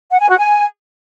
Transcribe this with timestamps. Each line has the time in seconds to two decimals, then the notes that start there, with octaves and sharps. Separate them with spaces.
0.11 F#5
0.20 G#5
0.29 F#4
0.39 G#5